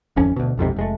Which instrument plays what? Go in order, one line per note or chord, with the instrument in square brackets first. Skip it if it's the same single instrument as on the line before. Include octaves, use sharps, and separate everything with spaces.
[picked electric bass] D1 G#1 F2 C#4
D2 B2
B1 F2 G#2 C3
F1 G#3 A3